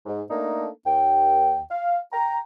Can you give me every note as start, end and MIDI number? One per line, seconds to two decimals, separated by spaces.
0.06 0.22 44
0.30 0.68 57
0.30 0.68 58
0.30 0.68 62
0.30 0.68 63
0.30 0.68 69
0.85 1.60 39
0.85 1.60 79
1.71 1.99 77
2.13 2.39 79
2.13 2.39 82